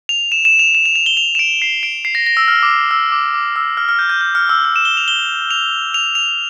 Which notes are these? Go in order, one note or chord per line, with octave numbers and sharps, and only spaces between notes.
F7
E7
E7
F7
E7
F7
F7
G7
F7
E7
D7
C7
D7
C7
A#6
A#6
E6
F6
D6
E6
E6
D6
D6
E6
F6
F6
G6
G6
F6
F6
E6
F6
E7
G7
F7
G7
F7
F7
F7